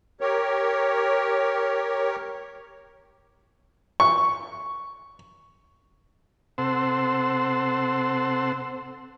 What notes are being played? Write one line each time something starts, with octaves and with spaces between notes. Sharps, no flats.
G4 A#4 C#5
C#6
C3 C4 A4 C5 F#5 E6